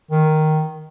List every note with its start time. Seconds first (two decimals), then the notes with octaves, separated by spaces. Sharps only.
0.11 D#3